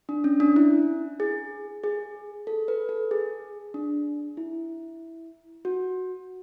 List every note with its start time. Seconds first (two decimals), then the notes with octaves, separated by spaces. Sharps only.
0.09 D4
0.24 C#4
0.40 D4
0.56 E4
1.20 G#4
1.83 G#4
2.47 A4
2.68 B4
2.89 A4
3.11 G#4
3.74 D4
4.37 E4
5.65 F#4